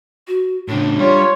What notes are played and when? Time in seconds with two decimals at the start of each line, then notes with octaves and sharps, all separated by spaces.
0.27 F#4
0.68 A2 C#3 D4
0.99 G3 F4 C#5